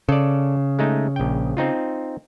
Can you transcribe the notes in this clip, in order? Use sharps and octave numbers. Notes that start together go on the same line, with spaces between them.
C#3 A4 D5
G#3 A3 D#4
A#1 G5
C4 D#4 F4